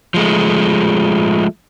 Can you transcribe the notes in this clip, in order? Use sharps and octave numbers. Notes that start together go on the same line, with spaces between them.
F3 G#3 A3